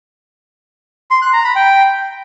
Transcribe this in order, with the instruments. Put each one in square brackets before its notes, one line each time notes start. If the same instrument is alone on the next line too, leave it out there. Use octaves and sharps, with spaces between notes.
[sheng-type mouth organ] C6
F#6
A#5
B5
G5